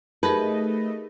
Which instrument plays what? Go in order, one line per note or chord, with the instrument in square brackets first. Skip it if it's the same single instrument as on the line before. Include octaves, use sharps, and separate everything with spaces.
[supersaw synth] A3 D#5 [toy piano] D#4 [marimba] G4 G#4 A#4 [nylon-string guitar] B4